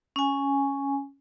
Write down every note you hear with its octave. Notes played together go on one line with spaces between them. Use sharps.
C#4 G#5